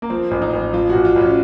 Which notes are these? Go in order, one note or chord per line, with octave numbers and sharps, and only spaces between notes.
A#3
F3 C4
A1
D#4
A1
F3 F4
F#4
A1
F4
A1
C#4